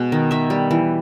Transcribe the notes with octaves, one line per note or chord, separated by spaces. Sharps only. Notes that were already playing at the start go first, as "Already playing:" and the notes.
Already playing: B2 G#3 B3
D#3
D#3 E5
G3
E3